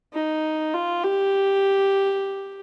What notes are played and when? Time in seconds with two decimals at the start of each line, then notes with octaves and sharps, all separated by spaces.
0.13 D#4
0.73 F4
1.03 G4